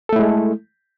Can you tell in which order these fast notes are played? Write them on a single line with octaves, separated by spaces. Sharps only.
A4 A3 E4 G#3